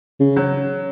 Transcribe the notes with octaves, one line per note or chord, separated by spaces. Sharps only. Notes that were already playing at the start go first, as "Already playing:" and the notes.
C#3
F#3